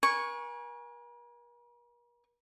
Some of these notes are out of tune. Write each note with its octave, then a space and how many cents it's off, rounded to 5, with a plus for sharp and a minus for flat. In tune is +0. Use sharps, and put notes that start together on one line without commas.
A#4 +45 G#5 -10 C#6 +0